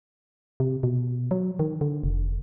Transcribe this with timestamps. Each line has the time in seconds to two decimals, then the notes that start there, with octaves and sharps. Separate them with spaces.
0.60 C3
0.83 B2
1.31 F#3
1.59 D#3
1.81 D3
2.04 F1